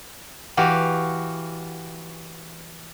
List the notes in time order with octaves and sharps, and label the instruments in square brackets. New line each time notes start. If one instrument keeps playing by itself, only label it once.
[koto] E3 F#4 G4 F5